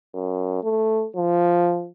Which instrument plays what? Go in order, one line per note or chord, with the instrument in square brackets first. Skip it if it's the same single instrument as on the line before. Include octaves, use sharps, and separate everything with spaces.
[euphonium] F#2
A3
F3